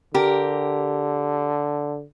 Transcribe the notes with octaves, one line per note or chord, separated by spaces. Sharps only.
D3 G4 A#4